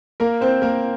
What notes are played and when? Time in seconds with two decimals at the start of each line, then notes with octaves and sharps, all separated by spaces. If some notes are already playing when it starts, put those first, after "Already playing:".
0.20 A#3 A#4
0.41 C4 C5
0.62 A#3 A#4